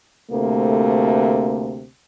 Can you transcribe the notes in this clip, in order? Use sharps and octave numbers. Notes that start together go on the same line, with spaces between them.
D2 C3 A3 A#3